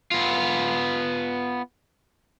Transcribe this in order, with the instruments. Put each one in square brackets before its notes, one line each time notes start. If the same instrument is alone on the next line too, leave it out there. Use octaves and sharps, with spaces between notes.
[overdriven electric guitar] B3 F4